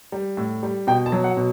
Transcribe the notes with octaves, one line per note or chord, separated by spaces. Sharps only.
G3
A2
G3
B2 G5
A5
F#3
F#5
B2